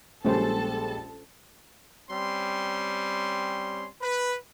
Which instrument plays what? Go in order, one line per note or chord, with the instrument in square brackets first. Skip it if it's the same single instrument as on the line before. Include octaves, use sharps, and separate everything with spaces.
[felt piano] A#1 G3 G#3 [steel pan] C#4 C5 [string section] A4 A5
[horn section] G3 C4 C#4 C6
B4